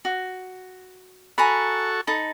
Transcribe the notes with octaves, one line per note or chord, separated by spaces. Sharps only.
F#4
F#4 A4 G#5 A#5 B5 C#6
D#4 A4 B5